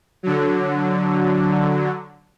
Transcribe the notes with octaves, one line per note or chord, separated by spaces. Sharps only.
D3 F#3